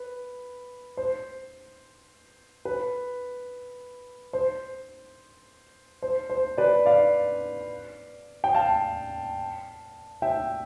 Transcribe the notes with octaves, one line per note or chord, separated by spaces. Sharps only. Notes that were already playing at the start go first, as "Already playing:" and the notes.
Already playing: B4
C5
B4
C5
C5
C5
B4 D5
D5 F5
G5
F5 A5
E5 G5